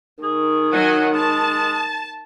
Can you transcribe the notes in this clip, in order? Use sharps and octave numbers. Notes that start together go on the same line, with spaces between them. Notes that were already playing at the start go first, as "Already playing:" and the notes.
D#3 G#4
F#3 D#5 F#5 G#5
G#3 A5